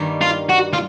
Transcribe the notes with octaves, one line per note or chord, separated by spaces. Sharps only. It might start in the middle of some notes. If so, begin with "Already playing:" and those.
Already playing: G2 D#3 G3 A#3
F4
F#4
F4